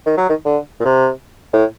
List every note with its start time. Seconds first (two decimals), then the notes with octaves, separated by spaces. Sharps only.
0.06 D#3
0.17 F#3
0.29 D#3
0.45 D3
0.80 A#2
0.85 C3
1.53 A2